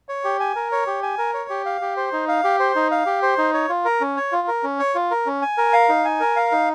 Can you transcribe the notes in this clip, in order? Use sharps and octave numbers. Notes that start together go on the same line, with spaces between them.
C#5
G4
G#5
A#4
C#5
G4
G#5
A#4
C#5
G4
F5
G4
C5
D#4
F5
G4
C5
D#4
F5
G4
C5
D#4
C#5
F4
A#4
C#4
C#5
F4
A#4
C#4
C#5
F4
A#4
C#4
G#5
A#4
F5
D#4
G#5
A#4
F5
D#4